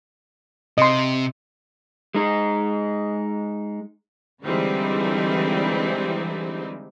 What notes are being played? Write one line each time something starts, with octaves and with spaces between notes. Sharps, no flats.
C3 D#5 C6
G#3 D#4
D3 E3 G3 G#3 C4 D#4